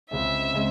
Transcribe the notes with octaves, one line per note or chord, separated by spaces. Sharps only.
C#2 C#3 G#3 C4 E5
C#3 G#3 C4